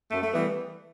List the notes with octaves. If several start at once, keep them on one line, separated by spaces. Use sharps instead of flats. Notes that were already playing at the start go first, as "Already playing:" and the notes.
F#2 A3
A3
E3 G3 B3